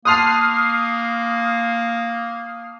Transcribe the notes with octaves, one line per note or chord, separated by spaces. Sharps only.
A#3 A5 C6 D#6 F6 F#6 C7